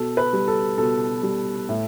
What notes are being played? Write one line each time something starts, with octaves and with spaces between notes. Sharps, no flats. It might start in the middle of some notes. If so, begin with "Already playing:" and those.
Already playing: B2 A4
B4
G3
A4
B2 A4
G3
A2